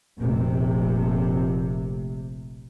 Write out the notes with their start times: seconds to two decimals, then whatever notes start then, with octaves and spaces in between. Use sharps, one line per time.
0.19 F1 A#1 C3